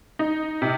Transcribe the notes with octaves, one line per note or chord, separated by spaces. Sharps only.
D#4
C3